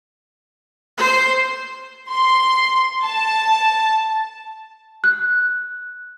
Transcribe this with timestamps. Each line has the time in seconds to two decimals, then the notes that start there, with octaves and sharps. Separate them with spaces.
0.97 C5
2.09 C6
3.03 A5
5.04 F#6